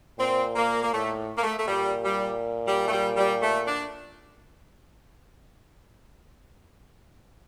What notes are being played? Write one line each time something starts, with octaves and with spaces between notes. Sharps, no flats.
A#2 C4
A#3
A#3
A2 A3
A#3
A3
A3
A#2 G3
G3
G3
A3
G3
G3
A3
D4